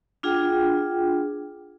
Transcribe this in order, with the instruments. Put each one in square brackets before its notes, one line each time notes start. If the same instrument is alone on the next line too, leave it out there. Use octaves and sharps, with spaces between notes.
[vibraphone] D4 F4 G#4 F#5 G5